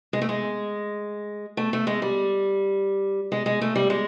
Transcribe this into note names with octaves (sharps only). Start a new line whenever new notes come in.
G#3
A3
G#3
A3
A3
G#3
G3
G#3
G#3
A3
G3
G#3